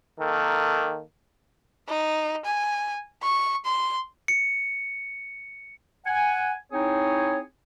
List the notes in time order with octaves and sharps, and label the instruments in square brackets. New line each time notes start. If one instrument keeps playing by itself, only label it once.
[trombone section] D#3 A#3 A4
[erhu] D#4
G#5
C#6
C6
[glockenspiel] C#7
[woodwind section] F#5 G#5
C4 D#4 E4 G#4 C#5